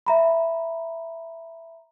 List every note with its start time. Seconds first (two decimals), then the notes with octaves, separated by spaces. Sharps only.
0.07 E5 A#5 B5